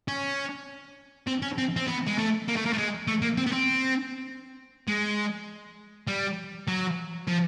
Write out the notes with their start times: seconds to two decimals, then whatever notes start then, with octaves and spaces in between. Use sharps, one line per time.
0.08 C#4
1.27 C4
1.42 C#4
1.58 C4
1.76 C4
1.87 B3
2.07 G#3
2.18 A3
2.48 A#3
2.56 A3
2.66 A#3
2.73 A3
2.78 G#3
3.07 A3
3.22 A#3
3.37 C4
3.46 B3
3.52 C4
4.88 G#3
6.07 G3
6.68 F#3
7.28 F3